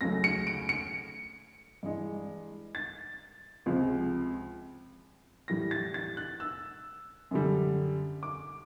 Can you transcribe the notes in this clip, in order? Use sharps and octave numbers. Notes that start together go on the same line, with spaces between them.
C#2 C#3 F#3 A3 A#6
C#7
D7
C#7
G2 E3 G#3
A6
C#2 C3 F3
A2 E3 G3 A#6
A6
A6
F#6
E6
F#2 D3 G3
D6